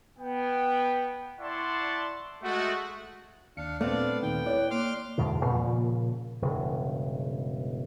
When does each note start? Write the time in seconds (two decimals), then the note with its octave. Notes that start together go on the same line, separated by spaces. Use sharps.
0.18 B3 G5
1.39 E4 D5 F#5 A5 C6 C#6
2.43 G#3 A3 F#4
3.57 D#2 D4 F5 C#7
3.81 A#2 A3 B3 C4 D4 D5 F5
4.22 D#2 A#2 D#3 G5
4.46 E4 C#5 D5 F#6
4.71 A#3 C6 D6 F6
5.18 E2 G#2 B2 D3
5.46 A#2 C#3 F3 A#3
6.42 E1 G2 C#3